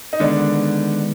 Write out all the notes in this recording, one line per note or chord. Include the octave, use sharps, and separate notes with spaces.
D#4
D3 D#3 G#3 B3 D4